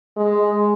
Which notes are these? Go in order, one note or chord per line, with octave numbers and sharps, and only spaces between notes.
G#3